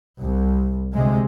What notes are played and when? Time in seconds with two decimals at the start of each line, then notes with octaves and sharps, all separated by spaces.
0.20 C2
0.93 D2 C3 G#3